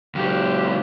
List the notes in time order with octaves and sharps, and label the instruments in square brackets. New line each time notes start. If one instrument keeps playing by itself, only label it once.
[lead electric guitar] C#2 F#3 [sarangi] G4